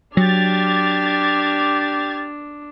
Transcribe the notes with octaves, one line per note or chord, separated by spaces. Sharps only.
F#3 D4 G4 F6 G#6 A6